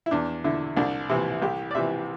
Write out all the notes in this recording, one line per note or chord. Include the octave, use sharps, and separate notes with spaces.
E4
E2 D4
D3 E4
C2 D4
C3 E3 E4
C2 G4
D5
C3 E3 E5